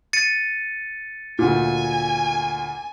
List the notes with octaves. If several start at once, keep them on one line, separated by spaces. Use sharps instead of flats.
A6 C#7 D#7
D2 A#2 G#5